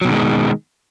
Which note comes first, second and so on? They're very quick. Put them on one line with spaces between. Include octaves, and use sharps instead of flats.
F#3 B2 D#3 G#3